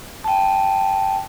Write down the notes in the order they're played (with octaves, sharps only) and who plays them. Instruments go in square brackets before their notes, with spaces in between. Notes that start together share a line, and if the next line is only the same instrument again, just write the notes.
[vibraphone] G5 A5